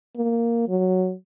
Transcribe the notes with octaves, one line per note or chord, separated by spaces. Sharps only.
A#3
F#3